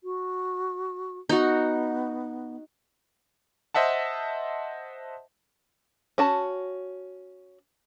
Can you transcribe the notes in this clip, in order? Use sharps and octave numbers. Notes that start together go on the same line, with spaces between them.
F#4
B3 D#4 F#4
C5 D#5 E5 F#5 A5
C#4 F#4 A5